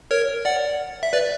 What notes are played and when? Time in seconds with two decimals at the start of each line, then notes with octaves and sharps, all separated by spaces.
0.11 A#4 C#5
0.45 D5 F#5
1.03 E5
1.13 B4 D5